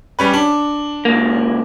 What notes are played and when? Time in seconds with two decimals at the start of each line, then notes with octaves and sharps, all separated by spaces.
0.19 G3 C#4 B4
0.34 D4
1.05 C#2 A#3